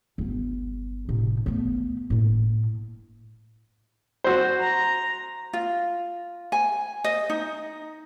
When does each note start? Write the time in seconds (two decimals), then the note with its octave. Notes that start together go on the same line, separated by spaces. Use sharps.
0.18 G1 B3
1.09 A2 C3
1.46 A3 B3
2.10 A2 A#3
4.24 F#4 C5
4.60 A#5
5.53 F4
6.52 G#5
7.04 D#5
7.30 D#4